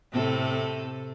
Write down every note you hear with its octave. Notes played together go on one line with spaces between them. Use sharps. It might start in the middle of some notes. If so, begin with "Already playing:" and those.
A2 C3 A4